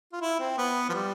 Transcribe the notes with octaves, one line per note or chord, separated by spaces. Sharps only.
F4
E4
C4
B3
F3
G3